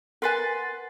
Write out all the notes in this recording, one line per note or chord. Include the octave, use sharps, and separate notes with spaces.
A#4 B4 F#5 G#5 C6 A6